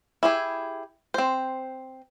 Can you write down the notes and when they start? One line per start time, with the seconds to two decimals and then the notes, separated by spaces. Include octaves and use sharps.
0.23 E4 G4 G#4
1.14 C4 C5